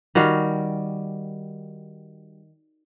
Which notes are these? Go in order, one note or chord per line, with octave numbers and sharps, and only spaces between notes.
D#3 G3 F#4 F5